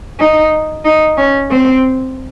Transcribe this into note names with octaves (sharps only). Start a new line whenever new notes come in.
D#4
D#4
C#4
C4